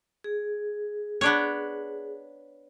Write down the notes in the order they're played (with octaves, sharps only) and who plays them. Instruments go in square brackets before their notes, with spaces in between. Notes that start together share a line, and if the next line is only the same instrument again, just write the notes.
[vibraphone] G#4
[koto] B3 D4 C#5